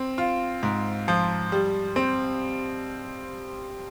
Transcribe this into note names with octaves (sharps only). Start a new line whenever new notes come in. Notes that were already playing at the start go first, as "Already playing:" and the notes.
Already playing: C4
F4
G#2
F3
G3
C4